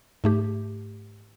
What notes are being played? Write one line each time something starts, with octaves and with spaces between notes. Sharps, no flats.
G#2 A3 G4